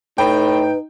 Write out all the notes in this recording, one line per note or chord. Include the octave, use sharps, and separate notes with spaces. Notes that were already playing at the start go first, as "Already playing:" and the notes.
A2 D#4 B4 G5